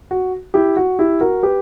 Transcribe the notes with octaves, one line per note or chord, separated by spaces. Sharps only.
F#4
E4 G4
F#4
E4 G4
F#4 A#4
G4 B4